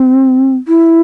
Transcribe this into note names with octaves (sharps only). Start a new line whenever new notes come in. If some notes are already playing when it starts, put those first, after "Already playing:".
Already playing: C4
E4